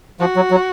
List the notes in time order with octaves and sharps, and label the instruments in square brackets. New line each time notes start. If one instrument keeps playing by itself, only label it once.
[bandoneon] F3 [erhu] F#4
[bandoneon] F#3
F#3